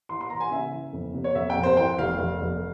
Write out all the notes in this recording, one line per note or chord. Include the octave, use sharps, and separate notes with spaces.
E3 C6
C6
E3 A#5
G#5
C#3 E5
E3
F2
C3
C#5
F2 E5
G5
F2
C5
E3 G5
F1 F5
F1
F1